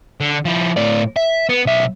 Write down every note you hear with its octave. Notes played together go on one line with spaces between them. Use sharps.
D3
F3 E4
A2 D5
E5
B3
B1 E5